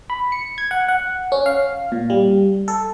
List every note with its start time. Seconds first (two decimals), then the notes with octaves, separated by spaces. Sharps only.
0.10 B5
0.32 C#7
0.58 G#6
0.71 F#5
0.88 F#5
1.32 C#4
1.46 F5
1.92 A#2
2.10 G3
2.68 A4